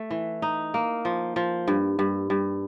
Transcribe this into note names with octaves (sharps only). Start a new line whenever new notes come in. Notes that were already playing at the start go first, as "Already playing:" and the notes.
Already playing: A3
E3
D#4
A#3
F3
F3
G2
G2
G2